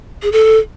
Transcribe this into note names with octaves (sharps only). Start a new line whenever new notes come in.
G#4
A4